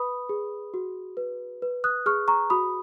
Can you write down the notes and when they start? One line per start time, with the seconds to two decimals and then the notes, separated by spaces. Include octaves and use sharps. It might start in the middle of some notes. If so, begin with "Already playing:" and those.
Already playing: B4 B5 D#6
0.29 G#4
0.74 F#4
1.17 B4
1.62 B4
1.84 D#6 F#6
2.06 G#4 C#6 F6
2.28 A#5 C#6
2.50 F#4 B5 D#6